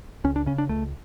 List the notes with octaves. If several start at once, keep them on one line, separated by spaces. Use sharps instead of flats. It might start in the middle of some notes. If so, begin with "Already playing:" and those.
C#2 C#4
D4
C#3 C#4
D4
C#2 A3